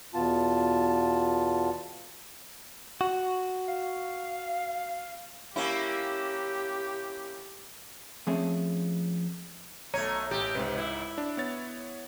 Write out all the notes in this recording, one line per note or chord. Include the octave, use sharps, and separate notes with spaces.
E2 B2 B3 F4 A5
F#4
F5
A#3 C#4 E4 G4
F3 A3 C4 C#4 G#4 E5
B1 A3 C#5 A#5 D#7
A1 G4
C#2 G#2 C3 B4
E4
D4
B3 C#5 A6